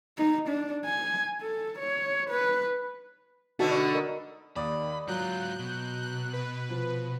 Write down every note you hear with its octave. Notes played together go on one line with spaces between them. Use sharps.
D#4
D4
G#5
A4
C#5
B4
B2 D3 A3 D#4 F#4 A5
D5
A#4 D#5
D#2 D5 B5 D#6
G#2 F#3 F4 F#6 G6
B2
F#6
B4
F3